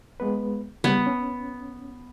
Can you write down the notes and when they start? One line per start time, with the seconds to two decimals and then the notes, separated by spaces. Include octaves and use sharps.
0.20 G#3 B3 B4
0.84 C#3 G3 B3
1.07 C#4